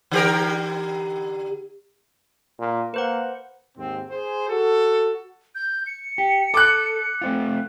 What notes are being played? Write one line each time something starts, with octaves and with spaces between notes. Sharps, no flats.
D3 G4 A#4
A#2
A#3 B4 C5 F#5
D#2 G#2 C4
G#4 C5
F#4 A4
G6
C#7
G4
A4 D6 F#6
A3 C4 F4